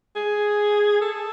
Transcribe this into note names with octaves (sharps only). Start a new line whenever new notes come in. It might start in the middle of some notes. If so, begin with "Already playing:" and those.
G#4
A4